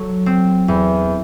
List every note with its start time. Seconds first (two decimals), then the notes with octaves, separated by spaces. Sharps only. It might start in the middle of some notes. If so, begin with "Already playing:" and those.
Already playing: F#3 A4
0.26 C4
0.68 E2